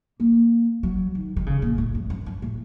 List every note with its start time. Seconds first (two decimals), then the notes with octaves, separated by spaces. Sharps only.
0.20 A#3
0.83 F#3
1.15 D#3
1.36 D#3
1.46 C#3
1.62 A#2
1.78 A2
1.95 F2
2.10 F#2
2.26 F#2
2.42 A2